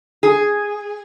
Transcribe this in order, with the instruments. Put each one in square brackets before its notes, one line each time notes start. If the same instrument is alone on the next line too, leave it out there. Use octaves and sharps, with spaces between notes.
[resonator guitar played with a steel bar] G#4